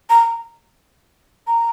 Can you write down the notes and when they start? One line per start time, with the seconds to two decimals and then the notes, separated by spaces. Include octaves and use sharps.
0.10 A#5
1.47 A#5